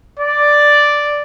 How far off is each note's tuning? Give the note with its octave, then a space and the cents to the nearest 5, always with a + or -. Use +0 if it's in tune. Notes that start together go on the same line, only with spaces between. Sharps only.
D5 +0